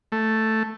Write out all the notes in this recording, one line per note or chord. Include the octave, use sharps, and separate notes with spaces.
A3